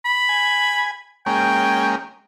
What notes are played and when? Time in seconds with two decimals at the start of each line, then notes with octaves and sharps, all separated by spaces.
0.05 B5
0.29 G#5
1.26 G#3 A#3 C#4 G5